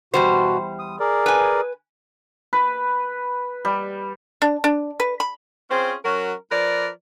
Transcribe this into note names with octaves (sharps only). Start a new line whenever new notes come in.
E2 B2 G3 F#4 C5
D#6
G#4 A#4 D5
B4 G#5
B4
G3
D4
D4
B4
B5
C4 C#4 F4 G#4 C5
F#3 C#4 F#4 A#4
F3 A#4 B4 D5